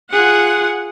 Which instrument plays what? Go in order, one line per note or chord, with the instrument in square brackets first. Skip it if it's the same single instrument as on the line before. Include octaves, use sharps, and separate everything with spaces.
[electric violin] F4 G#4 [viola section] F#5